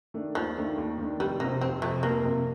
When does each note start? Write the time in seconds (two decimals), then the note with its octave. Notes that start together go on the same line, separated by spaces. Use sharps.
0.14 D#3 A3 D4
0.35 D#2 F3
0.56 D#3 A3 D4
0.77 D#2
0.98 D#3 A3 D4
1.19 F1 G3
1.40 F2 C3 A#3
1.61 F1 C4
1.82 F2 C3 A3
2.03 F1 A#3
2.24 F2 C3